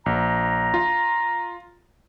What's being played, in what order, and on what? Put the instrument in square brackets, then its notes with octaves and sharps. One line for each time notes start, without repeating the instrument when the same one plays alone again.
[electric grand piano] A#1 [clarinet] A#5
[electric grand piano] F4